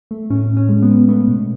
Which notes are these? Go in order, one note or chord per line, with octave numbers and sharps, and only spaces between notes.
A3
A2 C#4
A2
C#4
G#3
B3
G#3
A3 B3
B2